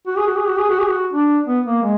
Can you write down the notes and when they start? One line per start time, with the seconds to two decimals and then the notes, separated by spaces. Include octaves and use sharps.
0.07 F#4
0.17 G#4
0.27 F#4
0.37 G#4
0.48 F#4
0.59 G#4
0.69 F#4
0.79 G#4
0.89 F#4
1.13 D4
1.47 B3
1.66 A#3
1.83 G#3